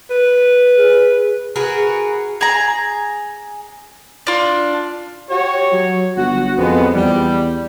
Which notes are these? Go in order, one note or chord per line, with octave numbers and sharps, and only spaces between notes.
B4
G#4
F#4 G#4 A#4 B4
G#4 A#5
D4 F4
F#4 G4 C#5
F#3
G1 F#4
F2 G#3 B3
E2 G3